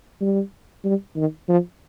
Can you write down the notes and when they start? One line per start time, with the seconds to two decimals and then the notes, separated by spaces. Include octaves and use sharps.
0.21 G3
0.85 G3
1.16 D#3
1.49 F3